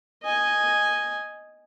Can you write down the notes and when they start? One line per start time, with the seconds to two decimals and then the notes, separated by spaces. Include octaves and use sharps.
0.23 D#5 G#5